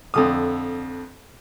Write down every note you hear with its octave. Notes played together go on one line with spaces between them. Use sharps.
F2 D3 D#6